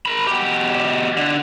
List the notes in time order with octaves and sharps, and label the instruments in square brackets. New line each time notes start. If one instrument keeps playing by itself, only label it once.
[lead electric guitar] A#4 B5
B2 G4
D3